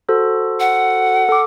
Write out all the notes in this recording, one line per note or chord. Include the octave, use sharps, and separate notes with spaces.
F#4 A4 C5
F#5
A4 D6